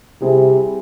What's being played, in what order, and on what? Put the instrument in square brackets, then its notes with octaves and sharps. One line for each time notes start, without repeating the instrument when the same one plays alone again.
[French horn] C3 [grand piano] G3 C4 E4 G#4